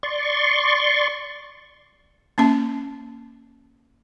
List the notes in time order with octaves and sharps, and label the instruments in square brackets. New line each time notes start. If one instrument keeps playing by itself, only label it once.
[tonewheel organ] D5 C6 C#6
[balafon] A#3 C#4 A5